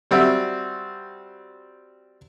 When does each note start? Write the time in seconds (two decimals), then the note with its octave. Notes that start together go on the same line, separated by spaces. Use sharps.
0.11 G3 C4 F#4 E5